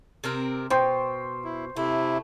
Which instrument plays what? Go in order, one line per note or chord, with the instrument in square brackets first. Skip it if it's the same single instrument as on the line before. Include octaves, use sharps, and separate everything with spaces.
[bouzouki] C3 C4 A#4
[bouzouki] B2 [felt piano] C5 G5 C6
[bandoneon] E4
[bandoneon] C3 E4 [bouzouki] A3